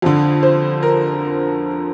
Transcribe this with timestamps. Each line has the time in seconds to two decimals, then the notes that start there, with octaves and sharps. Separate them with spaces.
0.02 F2 D3
0.43 C5
0.83 A#4